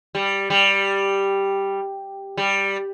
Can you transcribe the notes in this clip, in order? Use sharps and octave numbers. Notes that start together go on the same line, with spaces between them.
G3
G3
G3